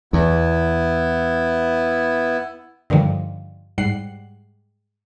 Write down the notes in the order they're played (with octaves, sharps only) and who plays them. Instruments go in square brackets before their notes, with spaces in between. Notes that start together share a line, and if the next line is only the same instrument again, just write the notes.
[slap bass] E2 [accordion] B3 E4
[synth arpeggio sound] G2 D3 D#3 F3 G3
G#2 G3 F#5 C7